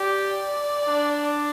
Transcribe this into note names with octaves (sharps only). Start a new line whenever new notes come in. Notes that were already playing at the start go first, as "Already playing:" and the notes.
Already playing: G4 D5
D4